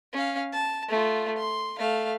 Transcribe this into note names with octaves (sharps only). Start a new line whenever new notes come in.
C#4 F5
A5
A3 F4
C6
A3 F5